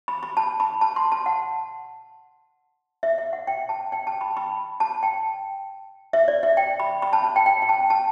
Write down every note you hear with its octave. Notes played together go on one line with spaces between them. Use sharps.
B5
B5
A5
B5
A5
C6
A5
F#5
E5
E5
F#5
G5
A5
G5
A5
B5
B5
A5
G5
E5
D5
E5
G5
B5
B5
A5
A5
G5
G5
G5
A5
A5